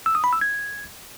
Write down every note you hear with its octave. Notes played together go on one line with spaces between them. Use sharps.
E6
D#6
B5
E6
G#6